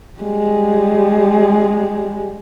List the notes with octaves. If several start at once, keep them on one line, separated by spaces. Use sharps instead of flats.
G3 G#3